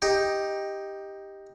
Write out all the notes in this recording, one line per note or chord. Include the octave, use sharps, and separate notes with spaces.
D#4 G4